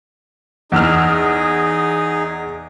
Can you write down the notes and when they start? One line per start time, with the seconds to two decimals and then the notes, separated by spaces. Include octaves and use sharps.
0.72 E2 D#4 G#4 E6 F6